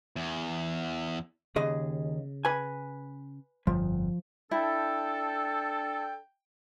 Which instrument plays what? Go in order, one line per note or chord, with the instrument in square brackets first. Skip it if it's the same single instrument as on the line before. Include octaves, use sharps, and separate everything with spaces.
[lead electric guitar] E2
[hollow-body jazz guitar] D#2 G#4 D#5 [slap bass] C#3
[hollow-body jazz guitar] B4 G#5
[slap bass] G1 F2 [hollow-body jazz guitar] F3
[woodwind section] D4 A4 [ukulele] E4 [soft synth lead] G5